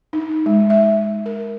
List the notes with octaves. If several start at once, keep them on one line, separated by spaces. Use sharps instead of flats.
D#4
G#3
E5
A#4